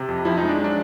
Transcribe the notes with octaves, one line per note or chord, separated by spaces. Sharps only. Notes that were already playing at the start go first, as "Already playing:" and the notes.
Already playing: C3
F2
F3 E4
D#4
G#3
D4
F#3 D4